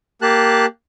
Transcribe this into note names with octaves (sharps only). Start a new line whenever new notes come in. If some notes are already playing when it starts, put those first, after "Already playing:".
A#3 G4 A5 F#6